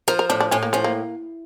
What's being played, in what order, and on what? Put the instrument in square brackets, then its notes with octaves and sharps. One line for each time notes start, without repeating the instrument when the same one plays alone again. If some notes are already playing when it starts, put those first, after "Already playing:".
[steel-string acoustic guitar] F3 [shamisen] A#4
[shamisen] A#4
[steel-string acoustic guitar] A2 [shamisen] D4
[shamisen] D4
[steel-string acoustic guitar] A2 [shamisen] C#4
[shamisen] A#3
[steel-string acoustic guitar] F3 [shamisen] C#4
[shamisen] A#3